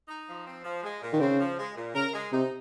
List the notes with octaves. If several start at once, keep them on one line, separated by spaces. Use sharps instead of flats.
D#4
F3
C4
F3
G#3
A#2
D#3
C#3 C4
F3
G#3
A#2
C#3 A#4
G#3
C3 D#4